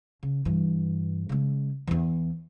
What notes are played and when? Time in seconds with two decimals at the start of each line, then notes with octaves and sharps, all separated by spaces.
0.23 C#3
0.45 G2 E3
1.29 C#3 G#3
1.87 E2 E3